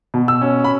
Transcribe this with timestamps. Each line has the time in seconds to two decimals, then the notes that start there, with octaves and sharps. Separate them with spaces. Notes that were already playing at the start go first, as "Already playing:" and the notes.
0.14 B2
0.28 E6
0.42 C#4
0.64 B5